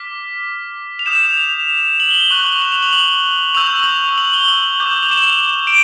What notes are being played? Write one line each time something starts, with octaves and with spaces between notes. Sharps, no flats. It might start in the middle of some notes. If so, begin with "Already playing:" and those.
Already playing: D6 F6 B6
F7
D#6 G6 E7
F7
F7
F#7
G7
F#7
C#6 F#6 F7
F#7
F7
F7
F#7
F#7
C#6 E6 G6 F7
F#7
F7
F7
F#7
G7
F#7
D6 G6
F7
E7
D7